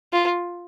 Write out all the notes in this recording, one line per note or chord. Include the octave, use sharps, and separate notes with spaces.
F4